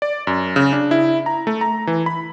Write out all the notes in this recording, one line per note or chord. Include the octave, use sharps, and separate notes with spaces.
D5
F#2
C#3
D4
E4
A#5
A3
A#5
E3
B5